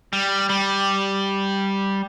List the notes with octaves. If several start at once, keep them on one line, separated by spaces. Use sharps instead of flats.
G3
G3